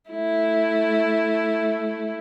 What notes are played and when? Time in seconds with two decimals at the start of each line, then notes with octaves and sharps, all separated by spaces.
0.10 A3 E4